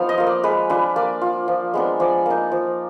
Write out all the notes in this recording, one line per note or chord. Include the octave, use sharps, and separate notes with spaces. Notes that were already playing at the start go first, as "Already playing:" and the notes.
Already playing: F3 B3 D#4 F5
D#5
A#3 F4
D5
G#3 B4
D4 F4 B4
A#3 D5
F4
F3
G#3 B3 D4
F3 D5
A#3 D#4
F3